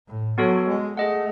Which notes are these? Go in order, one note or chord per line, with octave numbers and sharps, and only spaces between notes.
A2
F#3 B3 F#4 A4 C#5
G#3
A3 G#4 D#5 F#5